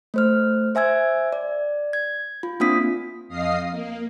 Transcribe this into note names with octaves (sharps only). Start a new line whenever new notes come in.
A3 C5 F6
C5 E5 G#5 E6 G#6
D5
G#6
F4
A#3 C4 D4 F4 D#6 B6
F2 D#5 F5 D#6 C7
A#3